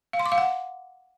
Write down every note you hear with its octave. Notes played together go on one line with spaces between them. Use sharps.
F5
C6
D6
F5
F#5